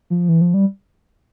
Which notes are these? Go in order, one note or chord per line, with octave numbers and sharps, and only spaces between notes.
F3
E3
F3
G3